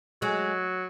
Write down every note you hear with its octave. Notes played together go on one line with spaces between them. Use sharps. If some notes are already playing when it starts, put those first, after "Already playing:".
F#3 G#3